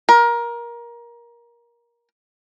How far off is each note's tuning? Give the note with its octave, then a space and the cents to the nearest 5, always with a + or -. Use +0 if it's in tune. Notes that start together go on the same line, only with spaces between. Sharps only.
A#4 +20